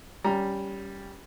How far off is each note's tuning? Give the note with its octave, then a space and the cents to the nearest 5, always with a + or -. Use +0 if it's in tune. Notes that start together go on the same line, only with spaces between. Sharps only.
G3 +0 C#4 +15 A#5 +5